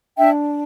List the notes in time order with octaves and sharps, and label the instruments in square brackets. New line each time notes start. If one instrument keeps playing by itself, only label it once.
[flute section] D4 E5 G5